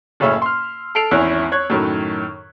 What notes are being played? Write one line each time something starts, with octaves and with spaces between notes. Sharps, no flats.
F#1 A2 C#3 C#4 E5 E6
C6 F6
A4 E6 C7 D7 F7
G#1 E2 C#4 E4 E5 F#6
C#5 C#6 F#6 G#6
F#2 A2 D#3